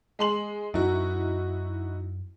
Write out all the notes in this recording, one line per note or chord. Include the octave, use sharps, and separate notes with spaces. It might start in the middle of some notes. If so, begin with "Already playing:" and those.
G#3 C6 F#7
F#2 D#4 E4 F#4